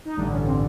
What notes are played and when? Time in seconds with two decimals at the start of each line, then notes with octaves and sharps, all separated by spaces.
0.05 D#4
0.17 A1 G2 D3 D4
0.32 C#4
0.47 C4